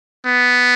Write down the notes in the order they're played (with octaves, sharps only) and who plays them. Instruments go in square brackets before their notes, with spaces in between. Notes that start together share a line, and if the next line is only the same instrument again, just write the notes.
[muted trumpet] B3